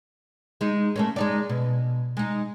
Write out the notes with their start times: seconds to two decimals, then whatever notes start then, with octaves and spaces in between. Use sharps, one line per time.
0.61 G#3 D#4
0.96 A3 A#3 C#4
1.16 G#3 D#4 D5
1.49 B2
2.17 G#3 D#4